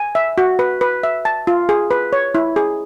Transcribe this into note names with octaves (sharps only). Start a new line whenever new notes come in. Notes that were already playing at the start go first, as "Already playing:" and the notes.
Already playing: G#5
E5
F#4
B4
B4
E5
A5
F4
G#4
B4
C#5
E4
G#4